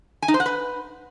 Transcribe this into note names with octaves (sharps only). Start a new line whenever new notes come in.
G#5
D#4
C5
F#5
B4